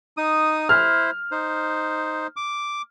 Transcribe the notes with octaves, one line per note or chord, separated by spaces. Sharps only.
D#4 D#6
E4 C5 F6
D#4 C5
D6